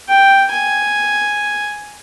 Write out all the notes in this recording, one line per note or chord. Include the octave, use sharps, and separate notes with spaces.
G5
G#5